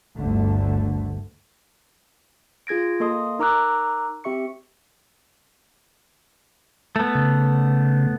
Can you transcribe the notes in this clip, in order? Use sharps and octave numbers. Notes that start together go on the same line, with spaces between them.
G1 D2 D3 A3
F4 G#4 G#6 A#6 D7
A#3 A4 D#5 C6 D#6
D#4 A#4 A#5 D6 E6 F#6
C4 G4 E5 C#6 C#7
A3 B3
C#3